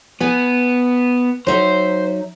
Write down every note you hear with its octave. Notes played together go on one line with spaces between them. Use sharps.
B3 B4 G#5
F#3 D#4 C5 E5